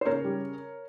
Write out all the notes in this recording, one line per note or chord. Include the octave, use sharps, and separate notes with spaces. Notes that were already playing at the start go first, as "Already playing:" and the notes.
C5
C#3 A#4 C#5
G3